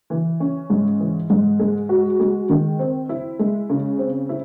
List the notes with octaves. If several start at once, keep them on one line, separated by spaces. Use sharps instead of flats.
E3
C#4
G#2
E3
G#2
G#3
F#4
G#3
D#3
C4
E4
G#3
C#3
C4
E4